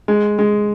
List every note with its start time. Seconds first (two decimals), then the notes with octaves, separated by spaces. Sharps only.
0.08 G#3
0.39 G#3